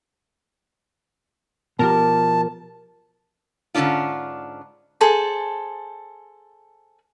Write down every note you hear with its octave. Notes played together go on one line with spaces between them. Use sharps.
B2 F3 G4 A#4 A5
G#2 D3 D#3 C#4 D4 F4
G#4 A4 C5 A5